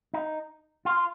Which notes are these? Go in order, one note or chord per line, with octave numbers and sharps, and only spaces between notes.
D#4
F4